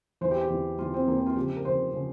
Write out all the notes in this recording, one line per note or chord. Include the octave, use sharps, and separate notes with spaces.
E2 E3 C5
G4
G4
E2 E3
E2 E3 F4
C4
E2 E3 A#3
C4
F4
C#2 C#3 F3 G4
A#4
C#2 C#3 F3 C5
C#3 F3